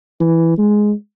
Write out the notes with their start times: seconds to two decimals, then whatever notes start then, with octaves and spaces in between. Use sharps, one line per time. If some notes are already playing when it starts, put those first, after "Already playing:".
0.20 E3
0.58 G#3